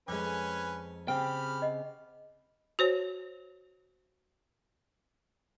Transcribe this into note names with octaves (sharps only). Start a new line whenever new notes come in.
F2 G#3 C#4 B4 G#5 D6
C#3 C4 G4 G5 B5 F6
D#5 F#5
F#4 C5 C#5